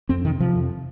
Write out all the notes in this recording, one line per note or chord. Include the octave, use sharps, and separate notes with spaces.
F2 C4
C3 D#3
C3 F3
F2